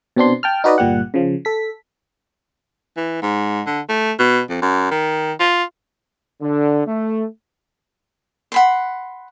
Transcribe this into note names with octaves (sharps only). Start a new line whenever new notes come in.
B2 C4 D4 C6
G5 A5 F6
D#4 F#4 B4 D5 D#5
G1 A#2 G3 G4 F#5
C#3 F3
A4 B6
E3
G#2
D3
A3
B2
F2
F#2
D#3
F4
D3
A3
F#5 B5 C6